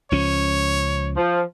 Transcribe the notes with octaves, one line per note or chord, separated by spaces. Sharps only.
C#2 F3 C#4 C#5
F3